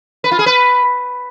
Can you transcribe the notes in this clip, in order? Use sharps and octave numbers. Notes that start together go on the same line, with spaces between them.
B4
F4
G#4
B4